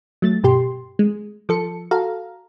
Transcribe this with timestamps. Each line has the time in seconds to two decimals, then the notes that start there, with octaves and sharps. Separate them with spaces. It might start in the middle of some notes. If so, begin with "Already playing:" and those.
0.22 F#3 A3 A6
0.43 G2 B2 G4 C6
0.99 G#3
1.49 F3 A4 C#7
1.91 F#4 A4 F5 A#5